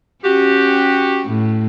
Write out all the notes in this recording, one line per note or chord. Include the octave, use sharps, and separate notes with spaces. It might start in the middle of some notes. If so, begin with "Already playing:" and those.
C#4 F#4 G4
A2